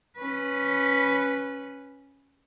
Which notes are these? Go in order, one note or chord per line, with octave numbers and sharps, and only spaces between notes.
C#4 B4